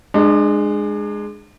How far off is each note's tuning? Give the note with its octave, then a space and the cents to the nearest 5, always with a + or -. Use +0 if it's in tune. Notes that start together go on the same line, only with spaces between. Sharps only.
G#3 +0 D4 +35